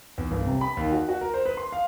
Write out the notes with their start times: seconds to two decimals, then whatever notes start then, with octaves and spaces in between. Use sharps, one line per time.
0.18 E2
0.31 G1
0.46 C3
0.61 B5
0.77 D#2
0.92 F#4
1.09 F#4
1.21 A#4
1.34 C5
1.46 B4
1.57 C6
1.72 F5